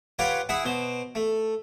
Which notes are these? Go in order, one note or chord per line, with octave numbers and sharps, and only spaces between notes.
F4 G4 B4 C#5 F#5
E4 G#4 E5 F#5
B2 C5
A3